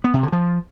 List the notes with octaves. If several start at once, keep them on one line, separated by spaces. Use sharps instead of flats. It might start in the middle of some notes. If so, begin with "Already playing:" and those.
B3
C3
D3
F3